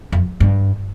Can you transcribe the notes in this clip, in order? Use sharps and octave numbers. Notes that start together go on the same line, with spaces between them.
F2
G2